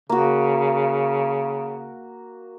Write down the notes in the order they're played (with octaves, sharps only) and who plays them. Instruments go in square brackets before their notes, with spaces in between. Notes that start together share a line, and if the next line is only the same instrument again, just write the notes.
[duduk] C#3 [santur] A#3 F#4